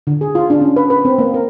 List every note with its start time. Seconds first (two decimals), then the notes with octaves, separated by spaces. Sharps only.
0.07 D3
0.21 G#4
0.35 F4
0.50 D4
0.61 C#4
0.76 B4
0.90 B4
1.05 C4
1.19 A#3
1.34 A#4